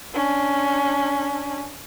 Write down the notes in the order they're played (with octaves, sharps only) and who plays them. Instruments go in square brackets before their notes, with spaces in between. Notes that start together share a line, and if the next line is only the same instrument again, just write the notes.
[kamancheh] C#4 D4